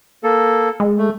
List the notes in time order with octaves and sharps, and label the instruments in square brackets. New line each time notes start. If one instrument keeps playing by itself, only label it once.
[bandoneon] A#3 A4
[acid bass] G#3
[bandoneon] A3